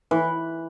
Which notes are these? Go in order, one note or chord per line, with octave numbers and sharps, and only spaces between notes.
E3